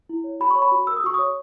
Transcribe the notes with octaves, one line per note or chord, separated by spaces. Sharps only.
E4
C#5
F#4 B5
C#5 C#6
B5
F#4
A#4 E6
D#6
F#4 C#6
C#5 D#6